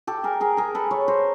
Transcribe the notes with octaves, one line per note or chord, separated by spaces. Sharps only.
G4 A4
G#4 A#4
G#4 A#4
G#4 A#4
A4 B4
B4 C#5
A#4 C5